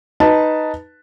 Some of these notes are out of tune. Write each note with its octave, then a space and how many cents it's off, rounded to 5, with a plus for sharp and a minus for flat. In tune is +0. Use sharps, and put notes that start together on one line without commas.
D#4 +0 B4 +0 A5 +0